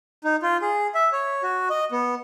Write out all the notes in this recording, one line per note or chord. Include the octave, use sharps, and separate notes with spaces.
D#4
F4
G#4
E5
C#5
F#4
D#5
B3